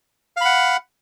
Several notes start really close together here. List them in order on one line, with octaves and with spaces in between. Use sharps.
F5 B5 F#5